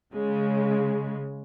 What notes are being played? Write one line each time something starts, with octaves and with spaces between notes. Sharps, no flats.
C#3 G#3